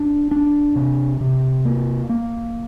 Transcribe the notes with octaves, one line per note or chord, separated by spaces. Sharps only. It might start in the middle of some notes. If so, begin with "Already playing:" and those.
Already playing: D4
D4
C3
C3
A#3
A#3